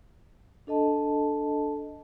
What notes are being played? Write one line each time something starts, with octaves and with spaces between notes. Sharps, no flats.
D4 A4 D#5 A5